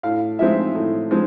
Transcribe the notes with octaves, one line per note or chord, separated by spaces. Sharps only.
A2 F5
F3 G#3 C4 D#4 E5
A2
F3 G#3 C4 D#4